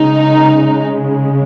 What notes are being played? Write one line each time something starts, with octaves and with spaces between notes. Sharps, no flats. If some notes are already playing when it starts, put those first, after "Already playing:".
Already playing: C#3 G#3 D#4